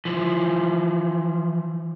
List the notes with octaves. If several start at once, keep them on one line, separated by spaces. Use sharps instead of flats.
E3 F3